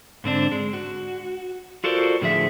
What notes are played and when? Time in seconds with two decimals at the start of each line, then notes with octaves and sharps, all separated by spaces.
0.24 G#2 D3 C4 D4
0.52 G#3
0.73 F#4
1.84 F4 F#4 A4 A#4 C5 D5
2.21 A2 D3 F3 G#4 E5